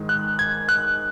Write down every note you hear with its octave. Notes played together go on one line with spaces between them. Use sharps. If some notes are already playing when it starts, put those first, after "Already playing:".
Already playing: G#2 D#3 G#3
F#6
G#6
F#6